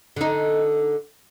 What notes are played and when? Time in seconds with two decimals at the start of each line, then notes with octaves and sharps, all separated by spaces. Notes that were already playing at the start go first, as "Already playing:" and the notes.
0.16 D3 D#4